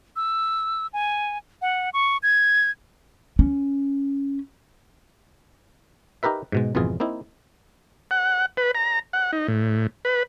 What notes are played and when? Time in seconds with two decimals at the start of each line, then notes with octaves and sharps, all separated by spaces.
0.16 E6
0.93 G#5
1.62 F#5
1.93 C#6
2.23 G#6
3.39 C#4
6.23 D#4 G4 A#4 B4 E5
6.52 G#2 B2 G#3
6.75 G#1 F2 B2 E3 F4 G#4
7.00 A#3 C4 D#4 E4
8.11 F#5
8.57 B4
8.75 A#5
9.13 F#5
9.33 D#4
9.48 A2
10.05 B4